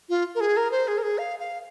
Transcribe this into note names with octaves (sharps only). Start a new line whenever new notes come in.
F4
A#4
G#4
A#4
C5
G#4
A#4
G#4
F5
F5